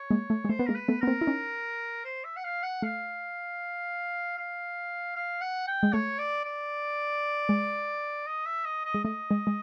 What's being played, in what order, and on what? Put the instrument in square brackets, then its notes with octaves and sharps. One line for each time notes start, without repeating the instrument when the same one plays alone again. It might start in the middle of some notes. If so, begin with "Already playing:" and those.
Already playing: [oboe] C#5
[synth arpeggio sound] G#3 A#3
A3
G#3
[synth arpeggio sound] A3 [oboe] C5
[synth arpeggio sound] B3
[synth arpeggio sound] G#3 A#3 [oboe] A#4
[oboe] B4
[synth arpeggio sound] A3 B3
[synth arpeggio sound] B3 [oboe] A#4
[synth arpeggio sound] A#3 C4
E4
C#4 D#4
[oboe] C5
E5
F#5
F5
F#5
[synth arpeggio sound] A3 [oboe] F5
[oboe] F5
F5
F#5
G5
[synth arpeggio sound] G#3
[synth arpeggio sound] A3 [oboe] C#5
[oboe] D5
D5
[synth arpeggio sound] G#3
[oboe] D#5
E5
D#5
D#5
[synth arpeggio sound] G#3
[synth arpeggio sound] A3 [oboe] D#5
[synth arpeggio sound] G#3
G#3